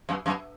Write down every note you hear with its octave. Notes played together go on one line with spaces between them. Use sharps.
F#2
F#2